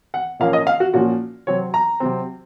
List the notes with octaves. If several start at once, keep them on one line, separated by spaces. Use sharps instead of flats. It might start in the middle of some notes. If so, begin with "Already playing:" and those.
F#5
A#2 F3 A#3 C#4 F5
D#5
F5
F#4
A#2 F3 A#3 C#4 F#4
C3 F#3 C4 C#5
A#5
C3 F#3 C4